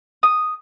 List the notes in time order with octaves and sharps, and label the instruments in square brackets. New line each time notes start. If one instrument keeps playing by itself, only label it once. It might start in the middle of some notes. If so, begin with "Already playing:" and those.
[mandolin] D#6